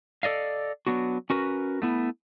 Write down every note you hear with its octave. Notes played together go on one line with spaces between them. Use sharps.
A4 D5 D#5 F5
F#3 B3 D4 F#4
C#4 F#4 A#4 B4
A3 B3 E4